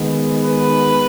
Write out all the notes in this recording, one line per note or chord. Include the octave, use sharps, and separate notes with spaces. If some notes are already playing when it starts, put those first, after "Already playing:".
Already playing: D#3 G#3 B3
B4